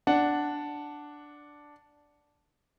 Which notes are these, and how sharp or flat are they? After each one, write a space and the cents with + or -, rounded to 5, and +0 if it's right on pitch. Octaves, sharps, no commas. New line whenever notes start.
D4 +0 F#5 +0